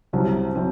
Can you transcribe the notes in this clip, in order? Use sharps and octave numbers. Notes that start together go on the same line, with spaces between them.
C2 C3 F#3 C4
F#3 C4